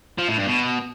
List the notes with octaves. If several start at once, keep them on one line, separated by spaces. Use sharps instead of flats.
F3
A2
G2
B2